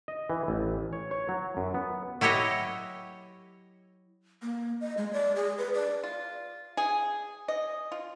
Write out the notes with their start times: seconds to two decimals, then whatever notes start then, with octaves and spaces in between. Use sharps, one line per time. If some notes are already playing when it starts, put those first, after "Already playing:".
0.08 D#5
0.30 E3
0.48 A1
0.93 C#5
1.11 C#5
1.29 F#3
1.57 F#2
1.74 B3
2.21 F#3 E4 G4 C#5 D#5
4.42 A#3
4.81 D#5
4.98 G#3
5.13 D5
5.36 G#4
5.58 B4
5.74 D5
6.04 F4
6.77 G#4
7.48 D#5
7.92 F4